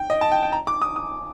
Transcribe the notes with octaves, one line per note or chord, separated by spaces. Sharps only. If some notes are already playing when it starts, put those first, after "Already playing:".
Already playing: G5
D#5
A5
G5
G5
A#5
D6
D#6
D#6